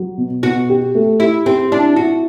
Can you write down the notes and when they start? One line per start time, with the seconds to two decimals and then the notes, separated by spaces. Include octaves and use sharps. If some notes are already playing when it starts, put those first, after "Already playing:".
Already playing: F#3
0.18 B2
0.43 B2 F#4
0.69 G4
0.95 A3
1.20 E4 G4
1.46 C4 G4
1.71 D4 E4
1.96 E4 F#4